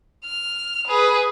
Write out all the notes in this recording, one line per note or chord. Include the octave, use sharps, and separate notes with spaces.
F6
G#4 B4